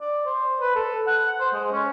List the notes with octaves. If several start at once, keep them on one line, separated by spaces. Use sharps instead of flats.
D5
C5
B4
A4
F#5
C5
G#3
C#4